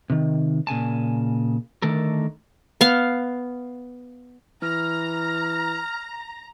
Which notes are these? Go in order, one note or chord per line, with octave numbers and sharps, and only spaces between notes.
C3 D#3
A#2 C#3 G#5 A5
D3 D#3 A3 A4 A#4
B3 F5
E3 A#5 F6